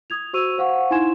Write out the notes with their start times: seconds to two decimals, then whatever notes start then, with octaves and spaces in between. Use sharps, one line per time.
0.10 D#6 G#6 F7
0.33 F#4 C5 C#6 E6 D#7 F7
0.58 C5 F5 F#5 C#6
0.90 D#4 E4 G#5 C6 G#6 E7